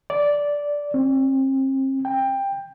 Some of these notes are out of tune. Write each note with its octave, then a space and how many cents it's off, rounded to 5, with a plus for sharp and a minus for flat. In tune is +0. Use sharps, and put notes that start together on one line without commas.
D5 -10
C4 +40
G5 +15